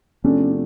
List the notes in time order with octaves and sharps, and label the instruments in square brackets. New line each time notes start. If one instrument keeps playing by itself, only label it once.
[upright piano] E2 C3 F3 A3 D4 [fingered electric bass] C#4